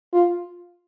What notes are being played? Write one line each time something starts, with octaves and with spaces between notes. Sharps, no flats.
F4